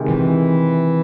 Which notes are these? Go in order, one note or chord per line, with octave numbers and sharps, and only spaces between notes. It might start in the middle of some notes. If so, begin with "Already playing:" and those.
Already playing: C3 D#3 G#3
E3